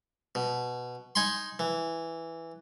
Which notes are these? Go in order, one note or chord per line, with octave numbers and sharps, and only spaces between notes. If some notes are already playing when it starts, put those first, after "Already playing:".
B2
D#4 G#5 B5 C6
E3